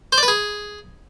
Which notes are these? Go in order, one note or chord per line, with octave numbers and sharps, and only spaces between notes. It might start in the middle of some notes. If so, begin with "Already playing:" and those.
C5
D5
B4
G#4